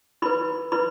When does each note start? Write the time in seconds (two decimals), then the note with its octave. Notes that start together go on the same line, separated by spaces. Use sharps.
0.22 E4 B4 B5
0.72 E4 B4 B5